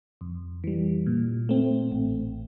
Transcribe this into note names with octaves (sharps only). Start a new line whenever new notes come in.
F2
E3 G3
A#2
A3 C4
A1